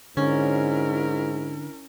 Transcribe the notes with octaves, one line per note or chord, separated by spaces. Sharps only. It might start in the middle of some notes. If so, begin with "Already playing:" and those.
G#2 D3 C#4 E4 A#4